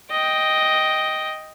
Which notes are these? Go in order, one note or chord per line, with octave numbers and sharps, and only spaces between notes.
D#5 G5